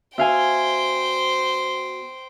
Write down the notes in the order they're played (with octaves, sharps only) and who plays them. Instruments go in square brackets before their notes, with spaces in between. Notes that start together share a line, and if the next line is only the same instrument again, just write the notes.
[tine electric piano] B3 F#4 [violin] C5 G5 [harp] E5 F5 G#5